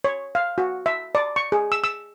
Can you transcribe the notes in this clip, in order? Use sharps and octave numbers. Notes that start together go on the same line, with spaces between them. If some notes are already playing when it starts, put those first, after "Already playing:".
C#5
F5
F#4
E5
D5
C#6
G#4
E6
E6